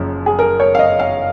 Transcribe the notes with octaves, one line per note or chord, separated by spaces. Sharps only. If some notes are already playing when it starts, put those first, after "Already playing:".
Already playing: F#1 F#2 F3
G#4
A#4
C#5
F5
D#5
F5